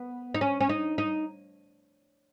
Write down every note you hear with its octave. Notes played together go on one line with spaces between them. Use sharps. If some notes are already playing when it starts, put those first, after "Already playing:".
Already playing: B3
D#4
C#4
C#4
D#4
D#4